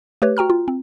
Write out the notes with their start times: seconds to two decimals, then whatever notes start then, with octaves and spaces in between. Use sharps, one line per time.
0.22 A3 G4 B4 C#5
0.37 F#4 G5 A#5 F6
0.50 F4
0.68 C4